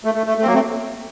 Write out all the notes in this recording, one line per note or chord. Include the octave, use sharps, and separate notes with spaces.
A3
A3
A3
A3
C4
F#3 A#3
A3 C4